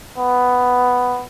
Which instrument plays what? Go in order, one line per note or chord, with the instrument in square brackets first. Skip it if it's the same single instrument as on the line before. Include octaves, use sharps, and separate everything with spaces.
[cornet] B3